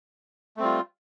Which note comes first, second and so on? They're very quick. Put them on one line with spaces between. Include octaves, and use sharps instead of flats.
A3 C4 G3 F4